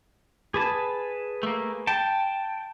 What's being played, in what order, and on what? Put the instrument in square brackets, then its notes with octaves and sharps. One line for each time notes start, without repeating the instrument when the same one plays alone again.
[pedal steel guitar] G#4 B4 A5
[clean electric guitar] A3 A#3
[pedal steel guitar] G5 [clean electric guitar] A5